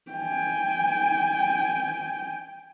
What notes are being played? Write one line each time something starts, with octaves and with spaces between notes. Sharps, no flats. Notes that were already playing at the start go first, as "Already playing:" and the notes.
G5 G#5